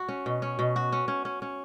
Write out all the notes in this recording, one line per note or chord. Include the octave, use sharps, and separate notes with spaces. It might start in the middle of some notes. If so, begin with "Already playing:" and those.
Already playing: F#4
C#4
B2
C#4
B2
F#4
C#4
C#4
C#4
C#4